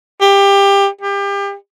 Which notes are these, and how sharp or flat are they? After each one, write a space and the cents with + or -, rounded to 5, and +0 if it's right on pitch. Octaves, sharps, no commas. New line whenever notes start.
G4 +20
G4 +30